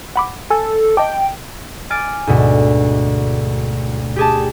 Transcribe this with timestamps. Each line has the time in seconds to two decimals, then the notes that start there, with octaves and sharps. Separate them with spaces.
0.16 F#5 B5 D6
0.50 A4 G#5 E6
0.97 D#5 G5 A5 D6
1.90 G#5 D6 F6 A6 D7
2.27 D2 G#2 B2
4.16 G4 G#4 A5